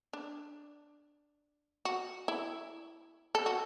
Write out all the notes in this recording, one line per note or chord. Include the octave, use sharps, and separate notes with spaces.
D4
F#4
E4
A4
F#4